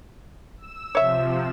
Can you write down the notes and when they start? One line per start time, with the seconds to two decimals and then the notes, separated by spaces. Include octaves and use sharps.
0.58 E6 E7
0.95 C3 F3 C#5 E5